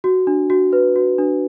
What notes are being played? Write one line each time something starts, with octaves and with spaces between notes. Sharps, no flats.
F#4
D4
F#4
B4
F#4
D4